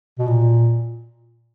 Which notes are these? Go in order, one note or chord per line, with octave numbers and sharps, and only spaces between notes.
B2
A#2